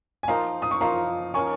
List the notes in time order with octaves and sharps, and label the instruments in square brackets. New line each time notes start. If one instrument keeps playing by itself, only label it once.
[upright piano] G#5
[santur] F3 A#3 D#4 A#4 [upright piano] F5 A#5
[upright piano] D#6
C#6
[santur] F3 A#3 D#4 A#4 [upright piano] F5 A#5
[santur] A#3 C#4 A#4 F5 [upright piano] G#5 C#6